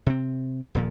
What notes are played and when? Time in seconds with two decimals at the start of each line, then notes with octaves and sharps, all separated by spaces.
0.06 C3 C4
0.75 D#1 A#2 F3